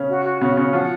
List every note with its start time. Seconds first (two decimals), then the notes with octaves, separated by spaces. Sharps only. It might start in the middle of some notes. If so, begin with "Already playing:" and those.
Already playing: C#3 C#4
0.09 F#4
0.25 F#4
0.41 C#3 C#4 F#4
0.57 C#3 C#4 F#4
0.73 F3 F4 F#5